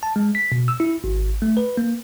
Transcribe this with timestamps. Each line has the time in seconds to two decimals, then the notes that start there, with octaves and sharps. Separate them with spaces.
0.03 A5
0.16 G#3
0.35 B6
0.52 B2
0.68 E6
0.80 E4
1.04 G#1
1.42 A3
1.57 B4
1.77 A#3